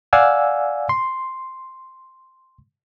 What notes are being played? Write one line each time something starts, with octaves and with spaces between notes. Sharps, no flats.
D5 F5 F#5 G#5 E6
C6